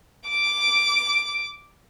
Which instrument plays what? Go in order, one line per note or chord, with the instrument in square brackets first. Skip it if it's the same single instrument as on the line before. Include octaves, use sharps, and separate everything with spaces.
[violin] D6 D7